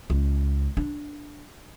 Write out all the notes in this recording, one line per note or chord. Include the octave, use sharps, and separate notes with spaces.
C#2
D4